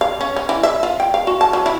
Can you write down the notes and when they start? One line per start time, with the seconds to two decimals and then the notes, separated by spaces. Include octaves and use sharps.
0.01 F5
0.21 C#4
0.36 C#4
0.49 E3
0.63 E5
0.83 F4
1.00 G5
1.14 F5
1.27 F#4
1.41 A5
1.53 F#3
1.66 E4